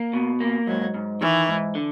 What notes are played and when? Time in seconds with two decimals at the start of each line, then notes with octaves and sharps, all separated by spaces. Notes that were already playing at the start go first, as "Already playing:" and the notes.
Already playing: A#3
0.13 B2
0.40 A#3
0.67 G#2 F#3
0.94 G#2
1.21 D#3 E3
1.48 G#2
1.75 D3